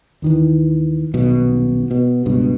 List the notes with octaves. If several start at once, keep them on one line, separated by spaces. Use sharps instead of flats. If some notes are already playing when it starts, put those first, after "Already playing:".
D#2 D#3 E3
D#1 B1 B2
B2
C#2 G2 B2